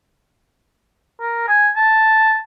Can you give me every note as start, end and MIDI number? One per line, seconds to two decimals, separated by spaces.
1.20 1.45 70
1.48 1.70 80
1.76 2.38 81